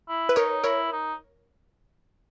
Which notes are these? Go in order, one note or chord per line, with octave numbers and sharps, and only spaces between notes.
E4
B4
D#4 A#4 C#5
E4 A#4 C#5
D#4